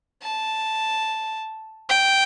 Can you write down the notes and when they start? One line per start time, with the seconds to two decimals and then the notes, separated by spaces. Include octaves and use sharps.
0.23 A5
1.89 G5